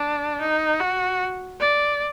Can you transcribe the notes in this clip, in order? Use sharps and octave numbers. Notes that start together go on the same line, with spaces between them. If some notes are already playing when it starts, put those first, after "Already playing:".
Already playing: D4
D#4
F#4
D5